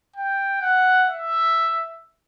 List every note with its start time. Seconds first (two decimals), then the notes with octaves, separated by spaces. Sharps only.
0.16 G5
0.62 F#5
1.08 E5